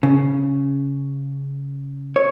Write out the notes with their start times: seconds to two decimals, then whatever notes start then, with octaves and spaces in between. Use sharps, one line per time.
0.03 C#3
2.16 C#5